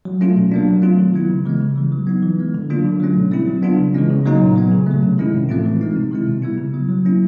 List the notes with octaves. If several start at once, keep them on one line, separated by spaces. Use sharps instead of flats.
F#3
A3 C#4 F4
B2
F#3 A#3 D4
F#3
A3 C4 F4
D#3
F#3 B3 E4
C#3
E3 G#3 B3
C#3
E3 G3
F#3
B3 D#4
E3
G#3 B3
D3
F#3 A#3 D4 F4
D3
F#3 A3 C#4
B2
G3 C4 E4
F#3
B3 D4 F4
C#3
E3 G#3 C#4
C#3
F#3 A#3 D#4
A#2
F#3 B3
C#3
F#3 A3
C3
D#3 G#3 C#4 E4
A2
F3 A3 C4 F4
E3
G#3 C4 D#4
C3
D#3 G#3 C4 E4
B2
G3 B3 E4
C#3
F#3 B3
F#3
A#3 C#4 E4